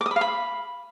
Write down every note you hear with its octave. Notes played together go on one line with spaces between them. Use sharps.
D6
D#6
B5
F5
B5